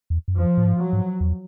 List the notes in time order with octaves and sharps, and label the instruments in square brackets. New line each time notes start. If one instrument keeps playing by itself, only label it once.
[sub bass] E2
F#2
[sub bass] F2 [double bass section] F3
[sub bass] A2
G#2
[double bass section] F#3
[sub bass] G#2
E2